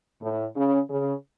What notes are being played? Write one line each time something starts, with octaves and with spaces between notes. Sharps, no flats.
A2
C#3
C#3